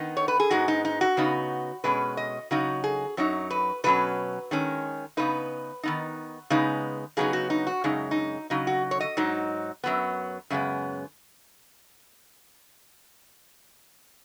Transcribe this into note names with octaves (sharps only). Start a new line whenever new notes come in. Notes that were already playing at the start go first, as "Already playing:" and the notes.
Already playing: D#3 B3 D#4
C#5
B4
G#4
G#2 G#3 B3 D#4 F#4
D#4
D#4
F#4
C#3 B3 D#4
B2 G#3 C#4 B4
D#5
C#3 F#3 D#4 F#4
G#4
F#2 F#3 D#4 C#5
B4
B2 F#3 C#4 B4
D#3 G#3 C#4
C#3 B3 D#4 B4
D#3 B3 D#4
C#3 G#3 B3 D#4
C#3 F#3 B3 D#4 G#4
F#4
D#4
F#4
F#2 C#3 G#3 D#4
D#4
C#3 F#3 D#4
F#4
C#5
D#5
G#2 F#3 D#4
F#2 F#3 B3
F#2 C#3 G#3 B3